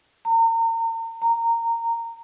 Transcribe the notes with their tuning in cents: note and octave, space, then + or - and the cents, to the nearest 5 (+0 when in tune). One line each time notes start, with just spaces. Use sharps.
A#5 -35
A#5 -15